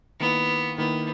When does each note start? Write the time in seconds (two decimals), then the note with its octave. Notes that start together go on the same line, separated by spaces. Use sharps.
0.20 D#3 A#3 B3 E4
0.78 D#3 A#3 B3 E4